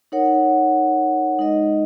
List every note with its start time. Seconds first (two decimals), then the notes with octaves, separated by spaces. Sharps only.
0.12 D#4 A#4 C#5 F#5
1.38 G#3 D#4 A#4 D#5